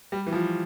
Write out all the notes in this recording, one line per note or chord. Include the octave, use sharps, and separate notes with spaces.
G3
E3
F3